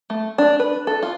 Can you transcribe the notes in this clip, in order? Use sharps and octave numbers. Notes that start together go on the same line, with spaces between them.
A3
D4
B4
A4
F4